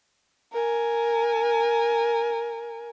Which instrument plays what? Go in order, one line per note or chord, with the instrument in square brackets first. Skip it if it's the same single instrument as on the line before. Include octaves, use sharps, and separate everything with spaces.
[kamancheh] A#4 G#5